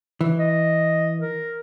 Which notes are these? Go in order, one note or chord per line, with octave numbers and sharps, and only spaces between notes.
E3
D#5
A#4